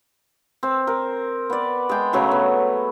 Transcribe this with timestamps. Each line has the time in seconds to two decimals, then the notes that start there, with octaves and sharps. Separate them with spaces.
0.63 C4
0.87 A#4
1.50 B3 D5
1.89 G#3 G5
2.13 C#3 F#3 A3
2.31 B3